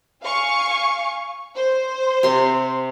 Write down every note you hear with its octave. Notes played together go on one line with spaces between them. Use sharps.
F5 G#5 C#6
C5
C3 C6